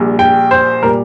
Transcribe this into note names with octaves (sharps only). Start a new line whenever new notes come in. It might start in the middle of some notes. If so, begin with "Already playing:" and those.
Already playing: A#1 A#2 G3
G5
C5
A#2 G3 A#4